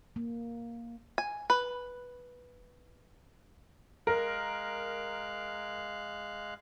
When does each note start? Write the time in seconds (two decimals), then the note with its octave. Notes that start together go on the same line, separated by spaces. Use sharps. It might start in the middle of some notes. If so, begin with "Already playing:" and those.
0.16 A#3
1.18 G#5
1.50 B4
4.07 G#3 A#4 F5 F#6